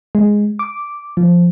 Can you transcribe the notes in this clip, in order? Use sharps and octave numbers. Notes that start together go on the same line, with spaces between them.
G#3
D6
F3